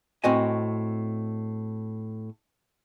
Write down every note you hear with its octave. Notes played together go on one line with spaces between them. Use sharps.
A2 C4 F#4 D#5 G#5